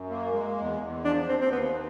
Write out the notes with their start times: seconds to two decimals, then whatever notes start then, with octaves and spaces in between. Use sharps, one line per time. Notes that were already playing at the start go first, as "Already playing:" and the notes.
Already playing: F#2
0.10 A#3
0.32 G#3
0.57 E2
0.81 E2
1.05 F3 D4
1.28 D#2 C4
1.41 C4
1.51 D#2 B3